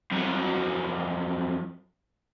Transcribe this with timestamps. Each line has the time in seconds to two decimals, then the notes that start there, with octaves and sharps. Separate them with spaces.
0.12 F2 F#3